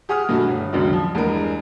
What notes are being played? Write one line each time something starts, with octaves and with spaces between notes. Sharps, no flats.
G4 G#4 F#5 D#6 F6
G2 B2 A3 F#4
G1
C#2 F#2 B2 D3 D#3
F3
E2 G2 G#3 A#4